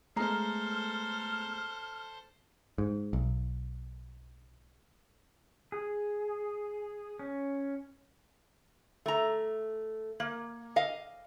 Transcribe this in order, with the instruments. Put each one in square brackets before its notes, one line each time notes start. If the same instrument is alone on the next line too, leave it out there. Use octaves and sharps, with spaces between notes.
[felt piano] G#3 A#5 C7 [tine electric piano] A3 B3 [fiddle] A4 C5 [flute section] F6
[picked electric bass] G#2
B1
[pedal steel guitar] G#4
C#4
[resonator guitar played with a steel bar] A3 A#5
A#3
D#5 F5